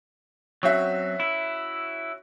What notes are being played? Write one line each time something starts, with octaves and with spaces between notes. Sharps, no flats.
F#3 C4 C#4 F#4 E5
E4